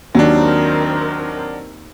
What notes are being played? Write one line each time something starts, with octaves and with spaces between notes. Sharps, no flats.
D#2 D#3 F#3 C4 D4 A#4